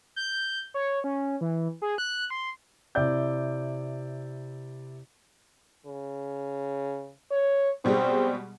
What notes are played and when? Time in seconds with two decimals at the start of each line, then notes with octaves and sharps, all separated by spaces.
0.16 G6
0.74 C#5
1.04 C#4
1.41 E3
1.82 G#4
1.98 F#6
2.30 C6
2.95 C3 E4 D5 G6
5.86 C#3
7.32 C#5
7.85 B2 G3 G#3 C4